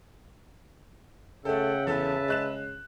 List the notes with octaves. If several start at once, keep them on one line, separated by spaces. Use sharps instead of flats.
C#3 A3 A4 E5 F#5 G5
E2 A4 B4 E5 A5
G#3 F#6 E7